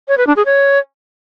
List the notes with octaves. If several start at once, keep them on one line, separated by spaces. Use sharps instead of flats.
C#5
B4
D4
G#4
C#5